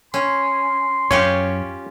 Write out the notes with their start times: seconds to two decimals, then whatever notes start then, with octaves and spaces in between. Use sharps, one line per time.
0.14 C#4 C6
1.11 F#2 C#4 F4 G4 C#5